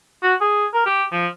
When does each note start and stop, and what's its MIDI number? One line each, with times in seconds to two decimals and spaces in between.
0.22 0.34 66
0.41 0.66 68
0.74 0.82 70
0.86 1.04 67
1.12 1.27 53